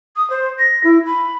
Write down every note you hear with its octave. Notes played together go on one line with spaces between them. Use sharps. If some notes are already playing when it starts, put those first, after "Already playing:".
D#6
C5
A#6
E4
B5